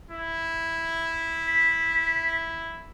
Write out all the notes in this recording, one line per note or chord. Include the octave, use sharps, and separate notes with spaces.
E4
B6